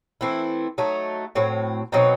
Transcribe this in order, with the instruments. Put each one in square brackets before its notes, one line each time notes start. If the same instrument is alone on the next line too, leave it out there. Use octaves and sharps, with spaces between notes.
[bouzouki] E3 A3 C4 E4
F#3 A3 D#4
A2 F#3 C4
B2 F#3 C4 D#4